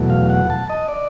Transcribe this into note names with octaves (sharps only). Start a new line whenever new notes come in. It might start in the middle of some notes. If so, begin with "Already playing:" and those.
Already playing: E2 B2 F#3 A3
F5
F#5
A5
D#5
D5